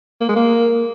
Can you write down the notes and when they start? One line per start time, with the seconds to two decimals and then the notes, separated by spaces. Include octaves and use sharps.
0.21 A#3
0.29 G#3
0.36 A#3